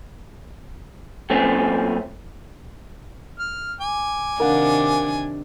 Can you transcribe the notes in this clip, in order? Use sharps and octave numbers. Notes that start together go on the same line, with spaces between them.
F#2 A#2 A3 C4 C#4
F6
G#5 D6
C3 D#3 D4 A#4 F5 F#5